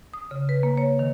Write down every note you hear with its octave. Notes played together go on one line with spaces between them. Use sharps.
D#6
C#3
B4
A#3
C#5
D#3